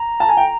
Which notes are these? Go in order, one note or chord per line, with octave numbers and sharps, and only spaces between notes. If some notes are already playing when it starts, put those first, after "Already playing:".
Already playing: A#5
A5
G#5
G5